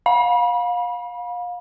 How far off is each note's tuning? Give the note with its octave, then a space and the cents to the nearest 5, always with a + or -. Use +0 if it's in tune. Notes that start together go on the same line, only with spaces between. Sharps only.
F5 +30 B5 -30